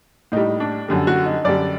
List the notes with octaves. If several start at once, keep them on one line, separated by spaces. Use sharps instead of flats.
A2 G3 D#4
D4
F#2 D3 G3
F#4
D#4
F#2 D3 G3 D5